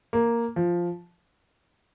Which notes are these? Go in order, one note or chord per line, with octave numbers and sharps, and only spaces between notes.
A#3
F3